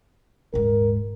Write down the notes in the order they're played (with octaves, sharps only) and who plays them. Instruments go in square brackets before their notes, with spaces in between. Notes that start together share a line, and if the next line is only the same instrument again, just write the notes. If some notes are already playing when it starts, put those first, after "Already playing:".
[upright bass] D#1 G#2 [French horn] A#4